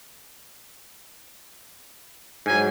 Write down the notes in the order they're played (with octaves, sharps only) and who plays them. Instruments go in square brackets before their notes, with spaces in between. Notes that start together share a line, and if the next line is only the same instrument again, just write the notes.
[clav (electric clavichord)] G#2 F#3 [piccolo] G#5